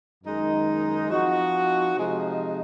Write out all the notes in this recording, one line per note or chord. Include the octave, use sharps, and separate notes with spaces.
F#2 D#3 G#3 D#4
F3 C4 D#4 F#4
C3 F3 G#3 D#4